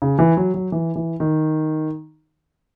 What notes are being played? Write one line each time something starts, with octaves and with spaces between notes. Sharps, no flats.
C#3
E3
F#3
F#3
E3
E3
D#3